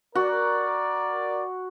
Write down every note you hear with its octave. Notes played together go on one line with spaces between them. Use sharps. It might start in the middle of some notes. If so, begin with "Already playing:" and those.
F#4 A#4 D5